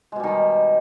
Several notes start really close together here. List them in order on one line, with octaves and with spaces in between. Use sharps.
G#3 B2 G3 D#3